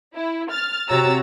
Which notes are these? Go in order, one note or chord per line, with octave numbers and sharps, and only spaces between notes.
E4
F6 A6
C3 F#4 C#5 A#5 E6 A6